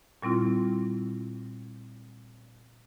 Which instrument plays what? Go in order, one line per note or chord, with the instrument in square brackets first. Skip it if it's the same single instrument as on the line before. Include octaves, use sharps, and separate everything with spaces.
[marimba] A#2 G3 C4 E4 F4